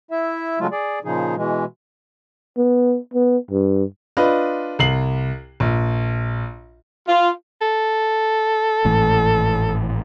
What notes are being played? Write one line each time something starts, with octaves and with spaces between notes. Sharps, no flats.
E4 E5
C#3 F#3 G#3 A3 F4
G#4 D5
A#2 C#3 F3 D#4 G#4
B2 E3 G#3
B3
B3
G2
D4 F4 B4 D#5
C2 C7 F#7
A#1
F4
A4
G#1 A2 E3